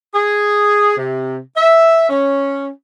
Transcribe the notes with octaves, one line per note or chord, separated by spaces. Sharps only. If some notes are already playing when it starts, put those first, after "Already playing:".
G#4
C3
E5
C#4